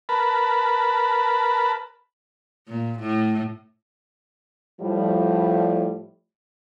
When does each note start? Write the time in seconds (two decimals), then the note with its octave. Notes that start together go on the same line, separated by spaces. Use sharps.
0.09 A#4 B4 A5 B5
2.68 A#2
3.00 A2
4.80 A2 F3 G3